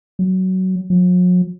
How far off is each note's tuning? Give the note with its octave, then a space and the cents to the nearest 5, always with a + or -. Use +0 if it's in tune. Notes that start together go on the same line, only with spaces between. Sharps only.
F#3 +15
F#3 -45